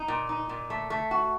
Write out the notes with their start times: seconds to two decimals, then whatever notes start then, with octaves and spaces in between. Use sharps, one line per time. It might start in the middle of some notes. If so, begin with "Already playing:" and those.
Already playing: D#4
0.08 A#2
0.29 D#4
0.49 A#2
0.70 A3
0.90 A3
1.11 F#4